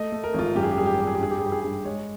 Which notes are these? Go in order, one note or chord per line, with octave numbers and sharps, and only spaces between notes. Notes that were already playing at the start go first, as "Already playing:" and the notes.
Already playing: A3 D#5
A3
A#4
G#1
F4
F#2 G4
G#4
G4
G3 G#4
G4
G#4
G3 G4
G#4
G4
G2 G#4
G4
G#4
G2 G4
G#4
G2 G4
G#3 C#5